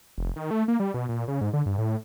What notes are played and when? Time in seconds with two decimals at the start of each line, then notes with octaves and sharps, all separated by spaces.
0.18 F1
0.36 D#3
0.51 A3
0.68 A#3
0.80 G3
0.94 B2
1.09 A#2
1.28 C#3
1.41 G#2
1.53 D3
1.66 G2
1.78 A2